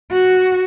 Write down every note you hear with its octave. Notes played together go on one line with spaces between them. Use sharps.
F#4